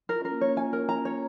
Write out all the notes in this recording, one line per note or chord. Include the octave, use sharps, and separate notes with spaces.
F4 A#4
C#4
A#4
A#3
C#4 C#5
F4 G#5
A#4
A#5
C#5